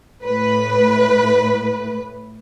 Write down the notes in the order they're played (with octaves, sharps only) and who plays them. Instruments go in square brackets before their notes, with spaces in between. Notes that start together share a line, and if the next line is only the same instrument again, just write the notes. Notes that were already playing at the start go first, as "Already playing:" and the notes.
[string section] A2 B4